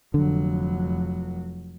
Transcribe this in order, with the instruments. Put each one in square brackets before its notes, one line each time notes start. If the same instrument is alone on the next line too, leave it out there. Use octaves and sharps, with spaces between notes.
[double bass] F1 F#3 [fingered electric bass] D3